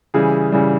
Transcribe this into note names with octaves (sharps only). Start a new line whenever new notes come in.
C#3 E3 G3 G#4
C#3 E3 G3